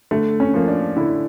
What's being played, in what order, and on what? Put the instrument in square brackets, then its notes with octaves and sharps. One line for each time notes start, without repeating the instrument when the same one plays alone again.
[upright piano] D3 [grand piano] A3
[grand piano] C#4
[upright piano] F3 A#3
[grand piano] D4
[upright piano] D3 [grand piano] E4